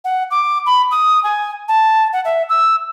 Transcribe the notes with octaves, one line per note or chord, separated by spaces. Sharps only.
F#5
D6
B5
D#6
G#5
A5
F#5
E5
E6